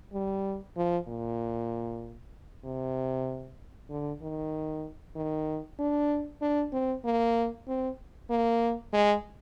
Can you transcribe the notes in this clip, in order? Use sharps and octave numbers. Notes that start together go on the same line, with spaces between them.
G3
F3
A#2
C3
D3
D#3
D#3
D4
D4
C4
A#3
C4
A#3
G#3